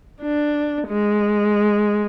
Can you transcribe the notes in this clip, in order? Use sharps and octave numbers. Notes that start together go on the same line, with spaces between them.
D4
G#3